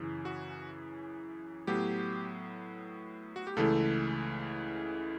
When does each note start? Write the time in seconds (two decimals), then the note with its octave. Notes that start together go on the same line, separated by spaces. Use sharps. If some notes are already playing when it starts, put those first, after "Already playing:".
Already playing: F#2 C#3 E3
0.25 F#4
1.67 A2 F#3 B3 G4
3.36 F#4
3.47 G4
3.56 C#2 C#3 E3 A3 A4